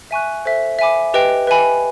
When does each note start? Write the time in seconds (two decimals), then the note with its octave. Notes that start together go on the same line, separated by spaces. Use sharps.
0.11 E5 G#5 C#6 F#6
0.45 A4 C5 E5
0.79 E5 G#5 B5 D6
1.14 G4 B4 D#5 G5
1.47 B4 E5 G#5 B5